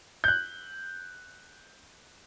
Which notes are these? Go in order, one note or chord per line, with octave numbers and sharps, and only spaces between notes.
F#6 G6